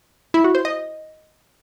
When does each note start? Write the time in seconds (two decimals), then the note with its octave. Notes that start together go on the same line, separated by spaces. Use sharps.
0.34 E4
0.44 F#4
0.55 C5
0.65 D#5